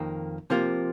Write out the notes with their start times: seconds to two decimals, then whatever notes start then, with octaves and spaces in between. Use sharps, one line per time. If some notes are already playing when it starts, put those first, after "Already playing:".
Already playing: F2 D#3 A#3
0.50 C3 F3 A#3 F4